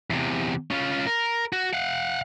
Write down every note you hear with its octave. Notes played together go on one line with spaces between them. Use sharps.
E2 C3
C#4 F4
A#4
F#4
F5 F#5